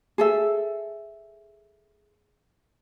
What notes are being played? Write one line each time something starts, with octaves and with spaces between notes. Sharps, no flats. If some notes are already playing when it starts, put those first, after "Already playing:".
G#4 A4 E5